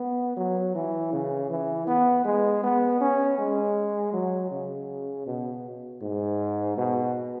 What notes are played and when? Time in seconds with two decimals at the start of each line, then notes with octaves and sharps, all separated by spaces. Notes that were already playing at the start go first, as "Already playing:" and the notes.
Already playing: B3
0.37 F#3
0.75 E3
1.13 C#3
1.50 E3
1.87 B3
2.25 G#3
2.63 B3
3.01 C#4
3.38 G#3
4.13 F#3
4.51 C#3
5.26 B2
6.02 G#2
6.77 B2